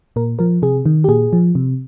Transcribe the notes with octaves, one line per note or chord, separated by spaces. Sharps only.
A#2 A#4
F3 A#4
C3 G#4
D#3
G4
A#2 G#4
F3
C3